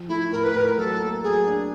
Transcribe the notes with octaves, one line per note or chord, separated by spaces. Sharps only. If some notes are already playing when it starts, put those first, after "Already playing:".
Already playing: F3
A3 E4
A2 A#4
B4
A2 A#4
F#3 A4
A#3
F#3 G#4
D4